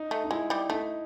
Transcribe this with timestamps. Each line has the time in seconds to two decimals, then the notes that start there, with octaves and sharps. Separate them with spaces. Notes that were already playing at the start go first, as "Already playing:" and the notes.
Already playing: D#4
0.11 A3
0.24 D#4
0.31 G#3 E4
0.50 G3
0.70 A3 D#4